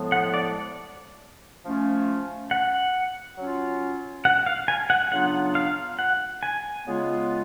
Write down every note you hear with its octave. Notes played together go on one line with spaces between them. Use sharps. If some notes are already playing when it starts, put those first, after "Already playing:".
Already playing: A2 F3 G#3 B3
F#5
D5
F3 A3 C#4 F4
F#5
F#3 C#4 F4
F#5
F5
G#5
F#5
C#3 F#3 B3 D4 F4 F#5
F5
F#5
G#5
C#3 G#3 B3 F4